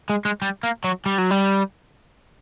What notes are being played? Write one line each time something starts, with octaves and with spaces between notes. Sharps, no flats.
G#3
G#3
G3
A#3
F#3
G3
F#3
G3